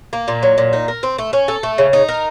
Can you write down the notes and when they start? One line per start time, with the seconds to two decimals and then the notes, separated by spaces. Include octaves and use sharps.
0.13 A#3
0.28 A#2
0.43 F#3
0.58 A#2
0.73 D#4
0.88 A#4
1.03 C4
1.18 A3
1.33 C#4
1.48 A4
1.63 A3
1.78 C#3
1.93 D#4
2.08 A#4